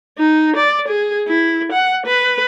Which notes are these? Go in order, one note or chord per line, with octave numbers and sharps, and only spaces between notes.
D#4
D5
G#4
E4
F#5
B4